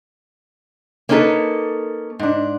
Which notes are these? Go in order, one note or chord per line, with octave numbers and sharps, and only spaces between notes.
A#3 C#4 D#4 G4 A4 B4
G#2 D4